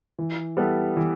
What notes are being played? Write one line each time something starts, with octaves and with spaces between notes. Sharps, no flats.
E3
G3 B3 E4 A4
E3